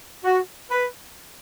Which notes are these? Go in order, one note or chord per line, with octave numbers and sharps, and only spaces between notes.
F#4
B4